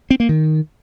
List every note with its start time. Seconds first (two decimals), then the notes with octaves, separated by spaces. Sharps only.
0.11 C4
0.20 A#3
0.29 D#3